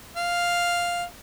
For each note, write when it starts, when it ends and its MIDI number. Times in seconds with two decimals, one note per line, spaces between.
0.16 1.04 77